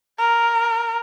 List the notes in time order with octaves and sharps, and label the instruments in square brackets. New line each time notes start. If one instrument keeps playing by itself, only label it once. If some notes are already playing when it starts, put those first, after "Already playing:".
[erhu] A#4